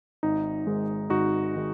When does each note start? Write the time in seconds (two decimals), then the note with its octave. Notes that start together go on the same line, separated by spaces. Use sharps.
0.23 G#1 D#4
0.67 G#2 D#3 G#3
1.10 G#1 D#4 F#4
1.56 D#3 G#3